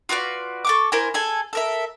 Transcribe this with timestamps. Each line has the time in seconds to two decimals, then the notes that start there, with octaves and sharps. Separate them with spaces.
0.09 F4 F#4 B4 D5
0.65 A4 C#6 D6
0.92 E4 A#4 C5 G#5
1.14 G#4 A4 G#5
1.53 A4 A#4 E5